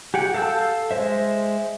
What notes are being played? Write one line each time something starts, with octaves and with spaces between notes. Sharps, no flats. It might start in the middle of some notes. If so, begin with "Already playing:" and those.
G4 G#4 F#5 G5
A4 F5 A5 E6 G6
G#3 C5 E5